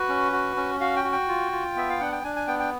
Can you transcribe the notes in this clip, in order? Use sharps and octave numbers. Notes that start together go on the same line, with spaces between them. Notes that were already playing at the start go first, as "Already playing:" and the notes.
Already playing: F#4 B4
C#4
F#4
C#4
F#4 F5
G5
F#4
G5
F4
F4
B3 E5
F5
D4 F#5
G5
D4 G#5
G#5
B3 G5
G5